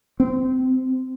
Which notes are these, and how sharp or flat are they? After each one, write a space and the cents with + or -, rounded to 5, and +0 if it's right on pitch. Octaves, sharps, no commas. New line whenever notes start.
C4 -20